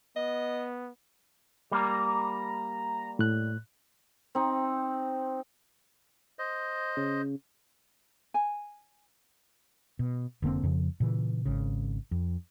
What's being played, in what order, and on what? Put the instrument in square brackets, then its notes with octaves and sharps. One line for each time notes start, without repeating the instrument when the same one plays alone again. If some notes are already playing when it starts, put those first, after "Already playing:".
[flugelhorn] B3 [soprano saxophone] D#5
[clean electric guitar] G3 A#3 [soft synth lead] A#5
[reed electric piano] A2 F#6
[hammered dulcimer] C4 D#4
[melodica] C5 D#5
[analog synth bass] C#3
[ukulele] G#5
[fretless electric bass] B2
F1 D3 A#3 C4
F2 C#3 F3
A#2 C#3 E3
G#1 C#3
F2